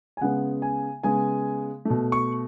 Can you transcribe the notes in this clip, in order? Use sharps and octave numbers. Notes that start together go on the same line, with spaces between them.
G#5
C#3 G#3 B3 F#5
G#5
C#3 G#3 B3 G#5
B2 A3
C#6